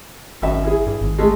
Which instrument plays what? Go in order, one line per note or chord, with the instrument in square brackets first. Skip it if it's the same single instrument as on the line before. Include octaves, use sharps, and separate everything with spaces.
[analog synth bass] G#1 [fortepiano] F#2 E5
[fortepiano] E4 G#4
[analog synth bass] G2
G#1
[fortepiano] G#3 A3